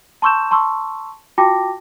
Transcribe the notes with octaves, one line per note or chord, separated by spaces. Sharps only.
A5 C6 C#6 E6 G6 E7
A5 C6 C#6 E6
F4 F#4 G5 A5 D6 A#6